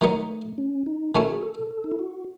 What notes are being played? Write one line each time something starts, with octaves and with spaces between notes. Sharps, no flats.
D#3 F#3 A3 B3 D#4
C#4
D#4
D#3 A3 C#4 E4 F#4
G#4
A4
A4
D#4
E4
F#4